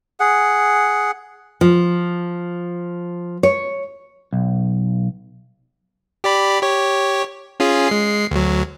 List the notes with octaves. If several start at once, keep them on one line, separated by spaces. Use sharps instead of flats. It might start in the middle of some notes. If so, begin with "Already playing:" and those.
G#4 F#5
F3
C#5
B1
G4 D5 B5
G4 C#5
C#4 F4 G#4
G#3 C7
D2 F#3